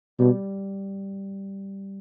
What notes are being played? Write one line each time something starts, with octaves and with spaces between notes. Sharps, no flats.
B2 G3